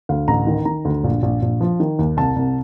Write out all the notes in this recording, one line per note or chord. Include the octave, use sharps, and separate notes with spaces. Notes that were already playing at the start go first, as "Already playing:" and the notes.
D2 F5
A1 A#5
D#3
D#3 A#5
D2
A#1
A#1
A#1
F3
D#3
D#2
C2 A5
C2